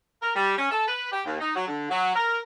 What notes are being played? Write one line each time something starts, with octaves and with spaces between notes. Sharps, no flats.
A#4
G3
C#4
A4
B4
G4
D#2
D#4
F#3
D3
F#3
A#4